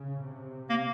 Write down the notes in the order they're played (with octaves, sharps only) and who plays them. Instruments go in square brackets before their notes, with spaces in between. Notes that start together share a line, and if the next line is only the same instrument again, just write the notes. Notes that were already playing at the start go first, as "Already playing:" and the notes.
Already playing: [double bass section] C#3
C3
[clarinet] A#3